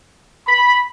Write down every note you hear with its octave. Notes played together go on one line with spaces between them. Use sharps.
B5